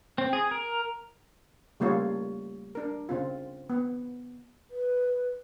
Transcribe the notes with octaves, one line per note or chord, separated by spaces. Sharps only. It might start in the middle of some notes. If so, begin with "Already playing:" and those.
C4
G#4
A#4
C#3 G3 A3 A#3 F4 C#5
D4 A#4
C#3 C4 F4
B3
B4